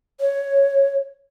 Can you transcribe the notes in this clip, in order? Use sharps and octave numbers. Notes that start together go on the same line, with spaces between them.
C#5